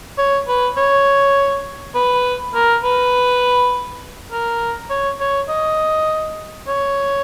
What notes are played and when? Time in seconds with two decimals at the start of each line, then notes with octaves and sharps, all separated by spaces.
0.18 C#5
0.48 B4
0.77 C#5
1.95 B4
2.55 A#4
2.84 B4
4.32 A#4
4.90 C#5
5.21 C#5
5.49 D#5
6.68 C#5